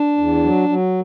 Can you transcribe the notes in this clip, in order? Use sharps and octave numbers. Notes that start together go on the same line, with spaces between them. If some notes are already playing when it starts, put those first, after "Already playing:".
Already playing: D4
E2
F#3
F#3